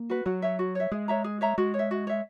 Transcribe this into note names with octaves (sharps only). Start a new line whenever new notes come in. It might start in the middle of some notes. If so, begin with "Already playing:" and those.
Already playing: A#3
F#4 B4
F#3 F#4
C#5 E5
F#4
C#5 E5
G#3 G#4
C#5 E5 A#5
G#4
C#5 E5 A#5
G#3 F#4
C#5
E5
F#4
C#5 E5